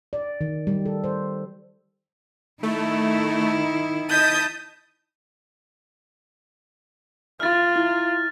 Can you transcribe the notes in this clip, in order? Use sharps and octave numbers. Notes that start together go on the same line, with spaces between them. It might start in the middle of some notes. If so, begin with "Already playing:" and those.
D5
D#3
G3
A4
C5
D#3 A3 E4
D#5 A5 D#6 G6 B6 D#7
F4 F6 A6
E4